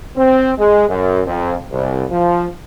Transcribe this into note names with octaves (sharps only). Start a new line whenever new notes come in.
C4
G#3
F#2
F2
C2
F3